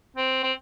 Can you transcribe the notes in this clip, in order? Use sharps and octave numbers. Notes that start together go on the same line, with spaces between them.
C4
C4